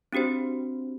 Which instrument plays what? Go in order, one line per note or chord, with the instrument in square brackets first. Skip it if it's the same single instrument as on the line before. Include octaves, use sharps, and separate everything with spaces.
[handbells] C4 D4 F#4 G4 C5